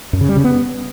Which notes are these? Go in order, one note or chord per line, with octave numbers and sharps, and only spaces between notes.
F#2
C#3
G3
C#3
B3